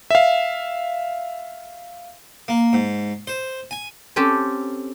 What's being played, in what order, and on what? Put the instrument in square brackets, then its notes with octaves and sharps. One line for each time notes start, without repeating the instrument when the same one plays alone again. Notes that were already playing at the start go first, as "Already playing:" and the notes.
[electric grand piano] E5 F5
[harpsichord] A#3
G#2
C5
G#5
[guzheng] C4 C#4 G4 A4